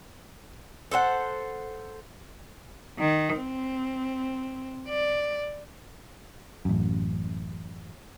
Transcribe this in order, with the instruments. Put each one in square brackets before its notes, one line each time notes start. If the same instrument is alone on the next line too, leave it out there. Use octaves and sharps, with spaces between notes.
[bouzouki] A4 C5 E5 F#5
[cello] D#3
C4
D5
[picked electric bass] A1 F#2